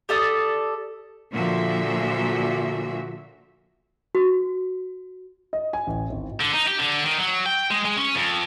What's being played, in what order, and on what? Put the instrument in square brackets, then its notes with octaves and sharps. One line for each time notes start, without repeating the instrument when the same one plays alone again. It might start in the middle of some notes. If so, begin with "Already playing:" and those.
[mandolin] G4 A4 D5 D#6
[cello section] A#2 D3 F3 A#3 F#4 E5
[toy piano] F#4
[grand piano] D#5
G#5
A1
G#1
[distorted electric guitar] D3
D#4
G4
D3
D#3
F#3
G5
G#3
G#3
C#4
F2